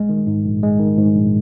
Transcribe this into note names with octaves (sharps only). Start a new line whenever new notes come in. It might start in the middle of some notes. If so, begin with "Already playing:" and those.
Already playing: A#1 G#3
D#3
G#2
A#1
G#3
D#3
G#2
A#1